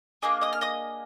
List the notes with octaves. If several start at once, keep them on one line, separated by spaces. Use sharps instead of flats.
A#3 D4 G#4 D#5 D#6
D#5 D#6
F6
D#5 D#6